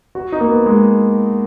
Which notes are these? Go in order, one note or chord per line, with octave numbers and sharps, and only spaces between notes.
F#4
D#4
A#3
B3
G#3